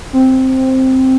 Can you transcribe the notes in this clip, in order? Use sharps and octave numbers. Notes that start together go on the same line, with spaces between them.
C4